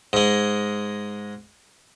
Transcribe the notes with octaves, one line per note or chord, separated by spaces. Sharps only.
G#2 G#3